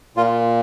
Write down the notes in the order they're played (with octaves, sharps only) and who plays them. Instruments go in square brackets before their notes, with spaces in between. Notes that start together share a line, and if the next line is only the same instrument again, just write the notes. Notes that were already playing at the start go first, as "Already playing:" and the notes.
[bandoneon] A#2 F4